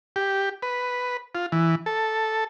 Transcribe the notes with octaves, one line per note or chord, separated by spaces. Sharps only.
G4
B4
F4
E3
A4